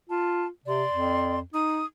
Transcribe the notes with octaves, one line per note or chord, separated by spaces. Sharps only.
F4 A5
C3 D5 C6
F2
D#4 D#6